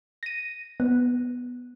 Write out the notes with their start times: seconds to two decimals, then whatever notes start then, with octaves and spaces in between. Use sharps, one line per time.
0.23 A#6 D#7
0.80 B3